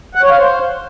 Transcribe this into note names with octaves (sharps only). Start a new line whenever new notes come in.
F#5
C#5
F5
C5